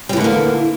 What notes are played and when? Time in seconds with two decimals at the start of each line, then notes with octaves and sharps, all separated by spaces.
0.09 G3
0.13 E3
0.17 D3
0.20 A3
0.24 A#3